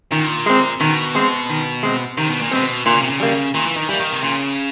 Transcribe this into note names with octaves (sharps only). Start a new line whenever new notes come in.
A#2 D#3
G#3 C4
B2 D#3
G#3 C4
D#3
G#3 C4
C3 D#3
B2
A#2
B2 G#3 C4
A#2 D3
C#3
C3
C#3
G3 A#3
A#2 D#3
E3
D#3
E3 G3 A#3
D#3
C3
A#2 C#3